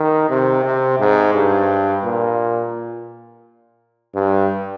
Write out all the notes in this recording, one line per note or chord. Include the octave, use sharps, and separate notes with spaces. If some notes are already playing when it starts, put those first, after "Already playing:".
Already playing: D#3
C3
C3
G#2
G2
A#2
G2